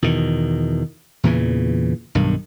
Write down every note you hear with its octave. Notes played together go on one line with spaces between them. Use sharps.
E2 B2 D#3
E2 A#2 C#3 E3
B1 G2 D#3